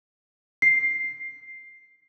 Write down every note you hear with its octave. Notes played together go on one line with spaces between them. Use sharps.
C7